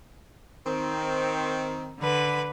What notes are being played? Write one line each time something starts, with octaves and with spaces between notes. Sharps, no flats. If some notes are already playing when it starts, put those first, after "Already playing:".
D#3 C4
D3 B4 B5